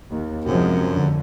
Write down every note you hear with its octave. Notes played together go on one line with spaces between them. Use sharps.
D#2
F#2 C3 F3 G#3
F2 D3